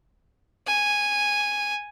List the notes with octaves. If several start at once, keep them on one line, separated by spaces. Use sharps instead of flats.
G#5